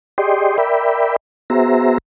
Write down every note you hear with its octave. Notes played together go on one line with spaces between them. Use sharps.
G4 G#4 D5 D#5 G5 C6
A#4 D5 E5 G5 B5
B3 F#4 G#4 C5 E5 A#5